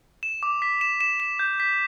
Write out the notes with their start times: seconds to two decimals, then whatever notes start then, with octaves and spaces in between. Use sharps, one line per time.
0.23 E7
0.43 D6
0.62 B6
0.81 E7
1.01 E7
1.20 E7
1.39 G6
1.60 B6